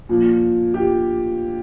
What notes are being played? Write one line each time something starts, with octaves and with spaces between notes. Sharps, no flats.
A#2 F3
G4